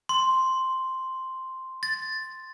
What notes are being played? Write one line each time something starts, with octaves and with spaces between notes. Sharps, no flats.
C6
A6